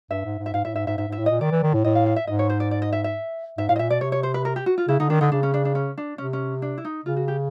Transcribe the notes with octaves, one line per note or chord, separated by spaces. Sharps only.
G2 E5
G#2
G#2
E5
G#2 F5
A2 E5
G#2 E5
G#2 E5
G#2 E5
G#2
E5
A2
A#2 D#5
D#3 D5
E3
D#3
A2
A2 D#5
F5
F5
E5
G#2 D#5
C#5
C5
D5
D5
D#5
E5
E5
G#2 E5
A2 F5
D#5
A#2 E5
B2 D5
C3 C#5
C#5
C5
B4
A#4
G4
F#4
F4
C#3 E4
D3 D#4
D#3 D4
D3 D#4
C#3 D4
C#4
D4
D4
C#4
D4
C3 C#4
C#4
D4
E4
D#4
C#3 F4
F#4
G4